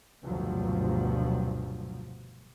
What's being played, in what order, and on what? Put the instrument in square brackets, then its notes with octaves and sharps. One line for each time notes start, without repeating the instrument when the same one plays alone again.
[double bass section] F1 D2 G2 B2 F3 F#3